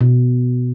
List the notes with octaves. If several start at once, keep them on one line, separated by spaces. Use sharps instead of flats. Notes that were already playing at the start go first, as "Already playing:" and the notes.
B2